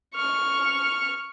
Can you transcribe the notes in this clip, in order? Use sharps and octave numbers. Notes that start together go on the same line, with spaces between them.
C#6 F6